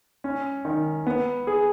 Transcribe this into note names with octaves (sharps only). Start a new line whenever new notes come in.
C#4
D#3
B3
G#4